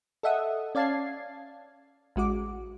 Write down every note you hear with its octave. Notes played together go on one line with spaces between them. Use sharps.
A4 D#5 E5 F#5 D#6
C#4 D5 F5 A5 G#6 C7
A1 G#3 F#4 D6